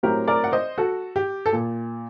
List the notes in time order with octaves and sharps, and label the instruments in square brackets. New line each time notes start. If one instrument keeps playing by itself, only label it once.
[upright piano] A2 F#3 C4 G4 A#4
A#4 D5
F#5
C5 D#5
F#4 A4
G4
A4
A#2